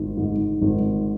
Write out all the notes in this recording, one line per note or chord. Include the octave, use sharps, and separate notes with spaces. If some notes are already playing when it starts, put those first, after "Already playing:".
Already playing: G#1
G#2
G#1